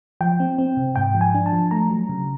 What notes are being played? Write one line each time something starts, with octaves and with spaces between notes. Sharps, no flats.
F3 G5
C4
C4
C3
G#2 G5
F3
G#5
D4
A5
F3
A3 A#5
F#3
C#3